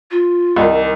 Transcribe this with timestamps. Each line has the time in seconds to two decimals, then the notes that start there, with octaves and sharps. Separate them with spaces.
0.11 F4
0.56 C2 D#3